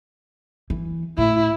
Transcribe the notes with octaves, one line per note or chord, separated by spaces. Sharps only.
E3
A2 E4